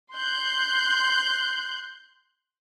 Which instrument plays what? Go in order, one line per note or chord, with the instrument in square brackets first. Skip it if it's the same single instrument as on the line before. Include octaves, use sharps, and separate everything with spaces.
[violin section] C6 F#6 G6